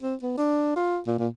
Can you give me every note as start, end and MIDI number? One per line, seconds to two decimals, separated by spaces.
0.02 0.15 60
0.22 0.35 59
0.37 0.71 62
0.76 0.98 65
1.07 1.14 46
1.19 1.28 46